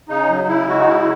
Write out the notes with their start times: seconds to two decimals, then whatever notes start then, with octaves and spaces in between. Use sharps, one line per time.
0.09 C#3 D#4
0.29 F#3
0.48 C#3 E4
0.68 G#3 F#4
0.79 D#4
0.87 C#3 E4